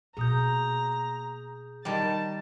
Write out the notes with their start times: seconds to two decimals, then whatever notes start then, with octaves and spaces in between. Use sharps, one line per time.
0.17 B2 A#3 G#4 A#5 D#6 G6
1.85 D#3 G3 A5